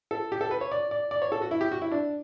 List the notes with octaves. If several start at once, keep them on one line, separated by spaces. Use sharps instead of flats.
A4
G4
A4
B4
C#5
D5
D5
D5
C#5
A4
F#4
E4
G4
F#4
E4
D4